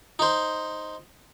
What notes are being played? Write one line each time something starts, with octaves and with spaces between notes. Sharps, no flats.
D#4 C5